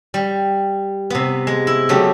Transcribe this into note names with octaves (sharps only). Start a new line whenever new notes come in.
G3
C3 B3
G#3
E4
C#3 F#3 A3 G4